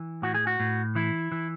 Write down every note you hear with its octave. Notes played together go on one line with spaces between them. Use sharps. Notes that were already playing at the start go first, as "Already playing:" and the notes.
Already playing: E3
A2 F#4
G#4
F#4
A2
E3 E4
E3